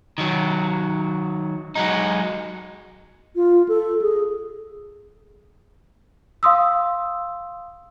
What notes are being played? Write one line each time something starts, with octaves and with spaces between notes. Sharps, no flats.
D#3 F#3
F#3 G#3 D#4
F4
A4
G#4
F5 C6 D#6 E6